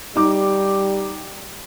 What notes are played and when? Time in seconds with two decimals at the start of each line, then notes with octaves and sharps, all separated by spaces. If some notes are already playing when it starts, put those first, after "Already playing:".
0.16 G3 D#4 D6